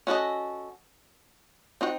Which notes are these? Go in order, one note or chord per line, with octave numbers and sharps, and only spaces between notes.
C#4 F#4 A4 C5 D#5
C4 D#4 F#4